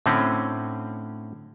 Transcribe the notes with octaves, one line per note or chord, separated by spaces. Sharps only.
A2 D3 C4 C#4